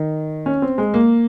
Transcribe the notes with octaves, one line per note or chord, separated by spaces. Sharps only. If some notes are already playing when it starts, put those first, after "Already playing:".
Already playing: D#3
C#4
C4
G#3
A#3